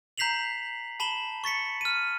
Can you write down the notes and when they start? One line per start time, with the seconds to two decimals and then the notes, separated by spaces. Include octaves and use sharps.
0.18 A#5 G6 B6 C7 F7 F#7
1.00 A5 B5 E7 F#7 G7
1.44 C#6 A6 B6 C#7
1.81 F6 D#7